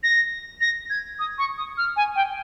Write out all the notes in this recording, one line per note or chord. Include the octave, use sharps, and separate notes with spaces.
A#6
A#6
G#6
D#6
C#6
D#6
F6
G#5
G5